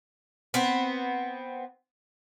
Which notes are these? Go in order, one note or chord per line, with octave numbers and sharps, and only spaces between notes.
B3 C4